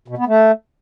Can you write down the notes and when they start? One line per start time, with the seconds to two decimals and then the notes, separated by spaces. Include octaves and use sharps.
0.08 B2
0.18 B3
0.28 A3